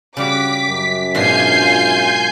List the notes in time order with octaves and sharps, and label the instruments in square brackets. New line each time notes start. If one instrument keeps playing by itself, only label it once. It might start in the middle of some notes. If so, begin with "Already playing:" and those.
[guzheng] C#3 G3 F#4 [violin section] D6 [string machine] B6
[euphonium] F#2
[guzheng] G#2 B2 D4 [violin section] F4 C7 [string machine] G#5 G6